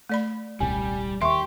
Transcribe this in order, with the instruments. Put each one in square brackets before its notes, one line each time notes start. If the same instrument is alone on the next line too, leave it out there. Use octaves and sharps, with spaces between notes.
[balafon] A3 D5 B5
[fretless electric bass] D#1 C2 [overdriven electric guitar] G3 [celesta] G#5
[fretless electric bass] D#2 [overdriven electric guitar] G4 [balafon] E5 [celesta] C6 C#6